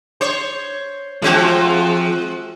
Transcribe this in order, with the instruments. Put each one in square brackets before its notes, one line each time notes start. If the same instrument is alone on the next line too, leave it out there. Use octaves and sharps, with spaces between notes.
[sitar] C5 C#5
[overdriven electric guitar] F3 [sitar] G#3 C4 F#4